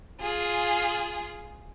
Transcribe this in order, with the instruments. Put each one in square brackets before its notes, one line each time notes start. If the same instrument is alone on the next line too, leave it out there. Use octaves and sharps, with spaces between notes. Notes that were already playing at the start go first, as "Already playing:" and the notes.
[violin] F4 G#4